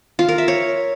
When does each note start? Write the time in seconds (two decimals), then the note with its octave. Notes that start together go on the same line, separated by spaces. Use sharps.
0.19 F4
0.29 A#4
0.38 E5
0.48 C#5